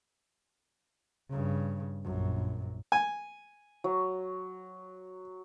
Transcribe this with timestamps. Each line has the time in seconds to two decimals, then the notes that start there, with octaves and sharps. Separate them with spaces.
1.30 G2 C#3
2.04 A#1 F#2
2.92 G#5
3.84 F#3